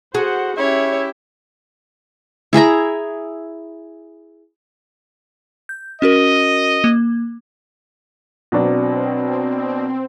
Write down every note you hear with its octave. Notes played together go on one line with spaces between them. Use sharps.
F#4 G#4 C5 F#5
C#4 E4 G4 C#5 E5
E4 G#4 E5 A#5
G6
C#4 F#4 A#4 D#5
A#3
B2 F#3 C4 D4